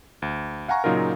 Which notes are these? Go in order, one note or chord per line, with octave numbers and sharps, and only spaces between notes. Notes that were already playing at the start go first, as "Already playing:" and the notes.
D2
F5 F#5 G#5 A#5 C#6
A#2 C#3 F#3 D#4 F4 A#4